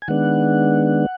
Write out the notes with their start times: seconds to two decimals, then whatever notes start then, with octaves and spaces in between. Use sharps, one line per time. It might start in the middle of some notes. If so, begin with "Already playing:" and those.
0.02 G#5
0.08 D#3 G#3 B3 D4 F#5